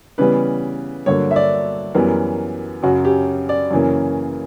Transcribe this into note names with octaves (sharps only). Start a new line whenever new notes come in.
C#3 E3 G3 B3 B4
G2 D3 F#3 A#3 C#5
E5
D5
F#2 E3 G3 B3 A#4
F#2 C#3 F#3 F#4
G4
D5
F#2 C#3 E3 A#3